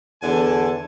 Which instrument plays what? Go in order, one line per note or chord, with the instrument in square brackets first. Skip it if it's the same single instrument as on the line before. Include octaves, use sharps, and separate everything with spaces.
[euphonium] E2 [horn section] D3 [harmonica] G#5 A5